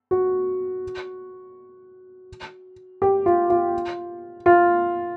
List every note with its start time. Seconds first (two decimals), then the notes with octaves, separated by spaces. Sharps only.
0.11 F#4
3.02 G4
3.26 F4
3.50 F4
4.46 F4